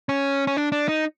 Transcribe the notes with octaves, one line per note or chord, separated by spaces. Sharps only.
C#4
C#4
D4
D4
D#4